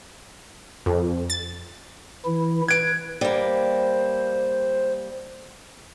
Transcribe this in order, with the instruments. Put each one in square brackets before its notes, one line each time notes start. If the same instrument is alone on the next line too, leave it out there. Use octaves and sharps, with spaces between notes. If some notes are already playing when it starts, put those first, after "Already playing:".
[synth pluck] F2
A6
[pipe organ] E3 E4
[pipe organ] B4 [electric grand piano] G#6 D7
[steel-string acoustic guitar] G3 A#3 [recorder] C5